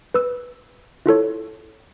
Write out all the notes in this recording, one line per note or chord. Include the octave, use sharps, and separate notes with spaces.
B4 E6
E4 F4 A4 C#5